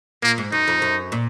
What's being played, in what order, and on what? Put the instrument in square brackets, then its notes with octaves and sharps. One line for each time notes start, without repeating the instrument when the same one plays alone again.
[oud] A#2 [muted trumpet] A#3
[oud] G#2
[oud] F#2 [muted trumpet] D#4
[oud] F2
F#2
A#2